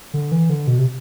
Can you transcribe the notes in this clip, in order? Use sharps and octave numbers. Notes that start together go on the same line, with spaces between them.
D3
E3
D3
B2
C3